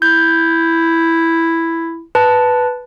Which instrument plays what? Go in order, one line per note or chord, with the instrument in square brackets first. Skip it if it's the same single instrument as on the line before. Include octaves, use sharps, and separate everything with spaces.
[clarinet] E4 [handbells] G6
[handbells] B4 A5